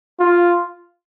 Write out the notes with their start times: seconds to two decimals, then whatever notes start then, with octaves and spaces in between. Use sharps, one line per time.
0.20 F4